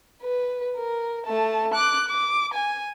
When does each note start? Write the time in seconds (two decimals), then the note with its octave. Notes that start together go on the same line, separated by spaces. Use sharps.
0.22 B4
0.77 A#4
1.26 A3 A5
1.74 D6 F#6
2.08 D6
2.54 G#5